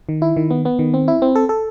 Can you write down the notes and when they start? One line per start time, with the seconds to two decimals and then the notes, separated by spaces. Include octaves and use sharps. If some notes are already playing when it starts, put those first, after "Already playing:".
0.09 D#3
0.22 E4
0.36 D#3
0.50 B3
0.65 B3
0.79 D#3
0.94 C4
1.08 E4
1.22 C4
1.35 A4
1.49 A4